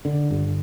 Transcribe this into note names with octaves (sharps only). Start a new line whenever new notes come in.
D3
G1